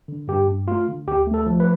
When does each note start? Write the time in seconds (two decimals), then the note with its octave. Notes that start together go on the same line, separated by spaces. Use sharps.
0.08 D3
0.28 G2 G4
0.47 G2
0.68 A3 F4
0.88 D3
1.07 D2 G4
1.27 A3
1.34 A4
1.46 F3
1.60 B4